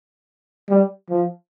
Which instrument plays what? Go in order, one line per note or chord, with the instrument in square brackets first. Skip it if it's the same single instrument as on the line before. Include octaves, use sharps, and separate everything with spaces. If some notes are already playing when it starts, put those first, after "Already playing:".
[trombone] G3
F3